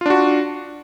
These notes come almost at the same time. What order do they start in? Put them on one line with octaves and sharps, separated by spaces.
F4 D4 F#4